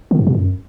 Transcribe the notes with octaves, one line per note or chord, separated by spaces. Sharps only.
D3
G2
B2
F#2